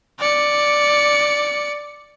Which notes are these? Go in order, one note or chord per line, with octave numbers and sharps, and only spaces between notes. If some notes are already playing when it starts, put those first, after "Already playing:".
D5 C#7